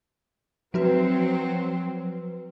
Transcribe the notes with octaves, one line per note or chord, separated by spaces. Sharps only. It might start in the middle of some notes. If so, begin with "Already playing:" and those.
F3 F#3 C4 F#4 B4